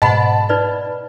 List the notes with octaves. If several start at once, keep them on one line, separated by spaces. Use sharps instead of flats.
G#2 B2 D#5 F#5 A5 B5 C6
D#4 B4 D5